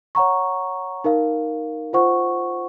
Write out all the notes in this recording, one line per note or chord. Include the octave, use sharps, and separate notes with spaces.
C#5 F#5 A#5 C#6
D#4 A#4 F5
F4 C5 F#5 C#6